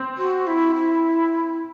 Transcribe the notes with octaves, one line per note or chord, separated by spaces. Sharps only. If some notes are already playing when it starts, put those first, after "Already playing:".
Already playing: C4
F#4
E4
E4